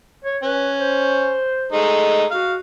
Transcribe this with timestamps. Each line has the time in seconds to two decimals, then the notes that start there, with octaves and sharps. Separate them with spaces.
0.24 C#5
0.43 C#4 B4
0.79 C5
1.72 G#3 A3 D#4
2.31 F#4 F5